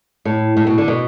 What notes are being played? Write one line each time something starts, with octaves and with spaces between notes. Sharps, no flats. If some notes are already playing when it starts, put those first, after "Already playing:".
A2
A2
B2
D3
B2